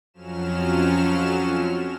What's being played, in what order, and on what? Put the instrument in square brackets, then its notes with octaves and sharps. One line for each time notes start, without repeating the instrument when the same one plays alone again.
[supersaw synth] F2 F3 F#3 C#4 F6 E7